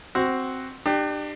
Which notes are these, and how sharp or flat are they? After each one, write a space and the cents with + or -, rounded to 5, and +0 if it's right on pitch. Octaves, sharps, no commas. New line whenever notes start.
C4 +0 F#4 +10
D4 +35 G4 +0